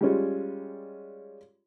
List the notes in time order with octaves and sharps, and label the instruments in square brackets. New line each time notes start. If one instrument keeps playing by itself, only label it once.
[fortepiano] G3 G#3 C#4 F4